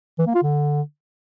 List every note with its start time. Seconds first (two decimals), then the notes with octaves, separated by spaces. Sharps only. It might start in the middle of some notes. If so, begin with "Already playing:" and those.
0.19 E3
0.27 A#3
0.35 F4
0.43 D3